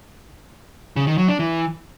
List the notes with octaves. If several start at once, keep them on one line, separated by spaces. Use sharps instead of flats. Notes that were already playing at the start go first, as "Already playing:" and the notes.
C#3
D#3
F#3
D4
E3